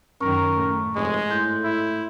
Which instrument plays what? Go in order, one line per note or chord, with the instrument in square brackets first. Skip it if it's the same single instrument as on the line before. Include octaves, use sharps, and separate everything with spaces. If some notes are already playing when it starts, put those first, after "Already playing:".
[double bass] F#2 D#3 [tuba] C#4 [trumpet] A#4 [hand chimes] A#5 C#6
[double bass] A2 A3
[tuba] F1 [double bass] G#2 [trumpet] G#3
[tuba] A2 [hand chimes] C6 G6
[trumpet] E4